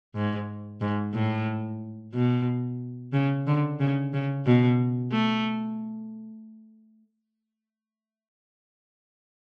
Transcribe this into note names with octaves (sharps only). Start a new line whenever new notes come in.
G#2
G#2
A2
B2
C#3
D3
C#3
C#3
B2
A3